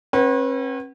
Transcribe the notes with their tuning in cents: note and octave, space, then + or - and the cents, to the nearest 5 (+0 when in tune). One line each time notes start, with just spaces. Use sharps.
C#4 -45 B4 -20 F#5 +30